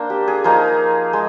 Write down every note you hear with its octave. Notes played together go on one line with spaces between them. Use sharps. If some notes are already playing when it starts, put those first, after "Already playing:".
Already playing: A#3 D4 C5
G4
G#4
F3 A#3 D#4 G#4
G#3